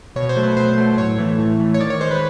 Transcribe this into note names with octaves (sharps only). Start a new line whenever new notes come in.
B2 C#5
C5
F#3 A3
B4
B2 C5
F#3 A3
A2 C#5
E3 A3
A2
E3 A3
C#5
D#3 D5
C#5
G#3 C5
B4